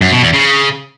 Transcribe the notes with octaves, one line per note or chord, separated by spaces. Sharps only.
F#2
B2
E2
C#3